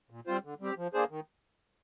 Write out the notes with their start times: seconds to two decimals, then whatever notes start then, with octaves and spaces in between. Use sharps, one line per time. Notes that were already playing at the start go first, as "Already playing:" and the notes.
0.10 A#2
0.27 G3 C4 F4 C5
0.44 D3
0.60 G3 C4 G4
0.78 F3
0.94 A#3 D4 G#4 C5
1.10 D#3